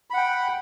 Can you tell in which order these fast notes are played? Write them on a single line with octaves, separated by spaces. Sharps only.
B5 F#5 G5